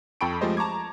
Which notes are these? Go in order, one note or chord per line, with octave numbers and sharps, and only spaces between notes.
F2 A4 G5 B5 C#6 D7
F3 G#3 A3 G4 C5 D#5
A5 A#5 C#6 D6 G#6